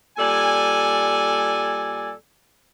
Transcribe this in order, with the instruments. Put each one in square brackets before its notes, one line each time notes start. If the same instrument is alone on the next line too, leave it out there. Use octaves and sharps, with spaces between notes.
[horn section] A#2 G3 A4 D5 G#5